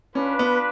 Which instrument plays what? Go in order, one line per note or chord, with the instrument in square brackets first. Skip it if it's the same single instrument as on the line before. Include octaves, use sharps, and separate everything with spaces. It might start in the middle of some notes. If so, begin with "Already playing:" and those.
[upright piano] C#4 [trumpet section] D4 F4 B4
[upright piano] B3